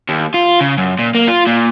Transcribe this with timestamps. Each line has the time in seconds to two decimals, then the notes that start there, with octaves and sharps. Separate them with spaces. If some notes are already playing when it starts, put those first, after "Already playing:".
0.09 D#2
0.34 F4
0.61 C#3
0.77 F#2
0.99 A#2
1.15 A#3
1.28 F4
1.47 A#2